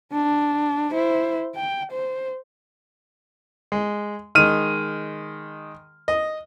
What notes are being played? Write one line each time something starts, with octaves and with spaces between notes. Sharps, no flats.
D4
E4 C5
G5
C5
G#3
D#3 G#3 F6 D#7
D#5